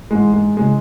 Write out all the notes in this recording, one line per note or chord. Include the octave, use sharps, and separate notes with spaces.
G#2 E3 G#3
G#3
C#3 E3 G#3